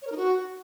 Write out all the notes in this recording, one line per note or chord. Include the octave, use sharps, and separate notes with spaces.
C#5
A#4
D#4
F#4